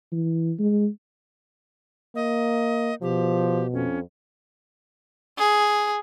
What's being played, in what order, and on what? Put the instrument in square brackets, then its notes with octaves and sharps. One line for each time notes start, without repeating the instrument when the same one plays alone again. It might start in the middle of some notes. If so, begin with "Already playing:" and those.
[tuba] E3
G#3
[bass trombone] A#3 [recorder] D#5
[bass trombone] B2 [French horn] F3 [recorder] G4
[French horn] F2 [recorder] C#4
[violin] G#4